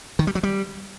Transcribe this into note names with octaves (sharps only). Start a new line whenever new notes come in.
D#3
G3
F#3
G3